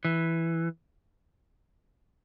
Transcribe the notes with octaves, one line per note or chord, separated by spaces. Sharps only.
E3